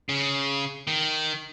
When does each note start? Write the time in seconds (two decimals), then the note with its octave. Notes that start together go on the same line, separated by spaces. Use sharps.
0.09 C#3
0.87 D#3